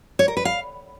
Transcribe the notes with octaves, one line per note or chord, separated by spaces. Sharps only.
C#5
A#4
B4
F5